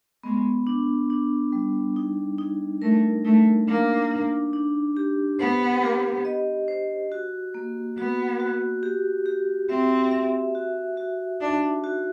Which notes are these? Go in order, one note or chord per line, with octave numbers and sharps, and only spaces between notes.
G#3 B3
D4
D4
G3
D#4
D#4
A3 A#4
A3 D#4
A#3 D4
D4
D4
G4
B3 C5
G4
D#5
C5
F#4
A#3
B3 F#4
F#4
G4
G4
C4 E5
E5
F#4
F#4
D4 D#4
F#4